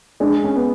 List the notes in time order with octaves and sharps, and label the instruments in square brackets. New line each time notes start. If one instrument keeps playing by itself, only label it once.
[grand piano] G#3 [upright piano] D4
[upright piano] C#4
[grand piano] B3